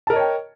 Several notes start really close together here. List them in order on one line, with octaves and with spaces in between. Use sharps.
A5 A#4 D#5 C#5 G5